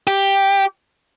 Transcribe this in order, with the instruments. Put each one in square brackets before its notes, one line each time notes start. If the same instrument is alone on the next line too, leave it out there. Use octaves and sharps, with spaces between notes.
[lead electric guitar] G4